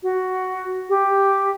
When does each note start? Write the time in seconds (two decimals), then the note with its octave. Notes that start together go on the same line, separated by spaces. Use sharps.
0.03 F#4
0.89 G4